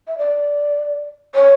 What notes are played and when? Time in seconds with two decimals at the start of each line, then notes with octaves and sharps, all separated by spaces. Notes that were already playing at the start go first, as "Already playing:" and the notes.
0.07 E5
0.18 D5
1.35 C#5